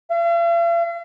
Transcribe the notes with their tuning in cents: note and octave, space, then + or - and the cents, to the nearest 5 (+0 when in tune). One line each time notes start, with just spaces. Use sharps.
F5 -45